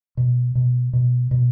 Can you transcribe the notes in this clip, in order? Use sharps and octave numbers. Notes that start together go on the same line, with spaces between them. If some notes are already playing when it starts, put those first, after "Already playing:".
B2
B2
B2
B2